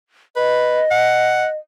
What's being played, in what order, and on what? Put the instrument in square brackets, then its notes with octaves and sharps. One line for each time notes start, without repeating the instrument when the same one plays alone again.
[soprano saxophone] B4 [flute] D#5
[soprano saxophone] F#5